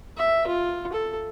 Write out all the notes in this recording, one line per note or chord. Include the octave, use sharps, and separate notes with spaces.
E5
F4
A4